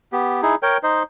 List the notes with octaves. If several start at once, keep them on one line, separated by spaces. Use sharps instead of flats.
B3 G4
D#4 E4 G#4
A#4 C#5 G5
D#4 C5 D#5